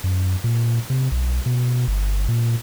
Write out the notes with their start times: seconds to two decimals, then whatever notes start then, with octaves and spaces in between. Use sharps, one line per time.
0.04 F#2
0.44 A#2
0.90 C3
1.12 B1
1.46 B2
1.88 G1
2.28 A#2